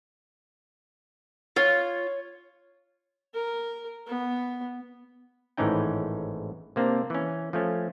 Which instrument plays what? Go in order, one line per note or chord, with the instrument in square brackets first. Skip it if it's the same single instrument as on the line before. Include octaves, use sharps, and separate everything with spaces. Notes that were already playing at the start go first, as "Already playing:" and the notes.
[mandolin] F4 [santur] C#5
[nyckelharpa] A#4
B3
[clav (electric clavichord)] G#1 A2 E3 C#4 D#4 G5
C3 A#3 C4 D4
E3 C#4
F3 A3 C#4